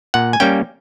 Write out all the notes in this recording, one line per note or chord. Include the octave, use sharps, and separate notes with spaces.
A#2 F#5
G#5
G3 A#3 C#4 G5